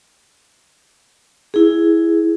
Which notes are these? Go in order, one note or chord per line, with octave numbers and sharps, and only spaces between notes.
E4 G#4